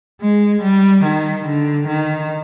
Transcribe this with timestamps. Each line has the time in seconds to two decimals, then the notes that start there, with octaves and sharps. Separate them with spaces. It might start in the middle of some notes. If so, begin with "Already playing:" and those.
0.21 G#3
0.63 G3
1.04 D#3
1.46 D3
1.88 D#3